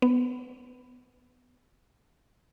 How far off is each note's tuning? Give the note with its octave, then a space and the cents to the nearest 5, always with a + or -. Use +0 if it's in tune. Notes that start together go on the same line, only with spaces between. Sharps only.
B3 +10